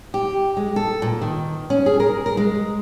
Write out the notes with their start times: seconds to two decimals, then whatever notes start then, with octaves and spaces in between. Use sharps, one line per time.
0.14 G4
0.57 G#3
0.76 A4
1.02 A#2
1.22 D#3
1.70 C#4
1.86 G#4
2.00 A#4
2.26 A#4
2.37 G#3